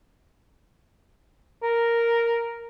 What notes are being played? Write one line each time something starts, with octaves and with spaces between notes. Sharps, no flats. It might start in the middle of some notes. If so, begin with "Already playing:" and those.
A#4